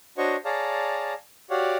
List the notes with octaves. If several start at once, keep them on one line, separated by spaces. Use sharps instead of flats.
D4 F#4 C5 C#5 D#5 C#6
G#4 C#5 D5 F5 A5 A#5
F#4 G4 C#5 D5 F5 F#5